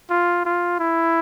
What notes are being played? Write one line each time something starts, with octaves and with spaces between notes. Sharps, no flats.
F4
F4
E4